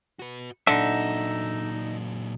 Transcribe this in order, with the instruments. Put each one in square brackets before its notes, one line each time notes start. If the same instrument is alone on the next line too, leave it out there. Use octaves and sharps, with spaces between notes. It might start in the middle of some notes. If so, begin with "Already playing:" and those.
[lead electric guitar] F#4 B4
[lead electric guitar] A#2 F#3 [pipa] D3 [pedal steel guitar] D#4 E5